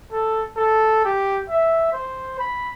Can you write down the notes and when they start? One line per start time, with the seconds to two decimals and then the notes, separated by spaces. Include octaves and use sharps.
0.12 A4
0.56 A4
1.05 G4
1.49 E5
1.93 C5
2.39 B5